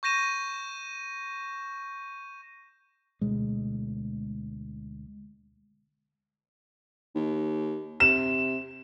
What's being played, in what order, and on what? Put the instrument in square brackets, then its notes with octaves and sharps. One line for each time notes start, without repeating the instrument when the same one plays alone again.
[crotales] C#6 G6 A#6 D#7 E7
[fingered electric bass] D2 B2 G#3
[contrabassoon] D#2
[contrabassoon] C3 [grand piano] E7